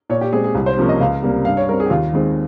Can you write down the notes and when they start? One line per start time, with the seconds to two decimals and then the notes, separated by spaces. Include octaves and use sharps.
0.10 A#2 C#5
0.21 G4
0.33 G#3 C4 G#4
0.44 G#4
0.55 C2
0.66 C5
0.77 C3 F3 A#3 C#4
0.89 D#5
1.00 C#2 F5
1.22 C3 G3 A#3
1.45 G2 F5
1.57 C#5
1.69 G3 C4 A#4
1.80 G#4
1.86 G4
1.90 D#2 F4
2.14 D#3 G#3 C4